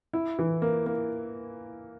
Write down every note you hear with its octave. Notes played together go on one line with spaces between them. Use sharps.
E4
E3
A#3
A#3